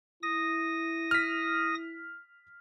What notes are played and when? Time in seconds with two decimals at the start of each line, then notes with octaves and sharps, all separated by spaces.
0.23 E4 D#6 A#6
1.11 F6 B6